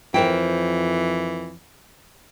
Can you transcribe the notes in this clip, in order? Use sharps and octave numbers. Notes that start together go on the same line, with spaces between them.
F2 E3 A#4 C5 G5